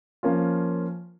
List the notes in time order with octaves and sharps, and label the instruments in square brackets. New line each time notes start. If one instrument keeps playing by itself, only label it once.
[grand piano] F3 A#3 C#4 F4